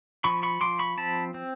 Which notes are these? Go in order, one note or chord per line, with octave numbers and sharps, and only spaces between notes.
F3 B5 C#6
B5 C#6
F3 C6 D6
B5 C#6
C4 A5 B5
C4